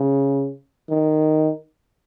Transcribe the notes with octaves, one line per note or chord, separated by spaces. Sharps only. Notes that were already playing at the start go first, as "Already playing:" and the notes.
Already playing: C#3
D#3